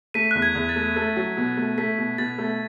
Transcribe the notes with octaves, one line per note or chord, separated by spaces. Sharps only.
A3 B6 D#7
E2 F#6
G#6
E2
A6
A3
A3
F#3
B2
A3
A3 B6
B2
B2 A6
A3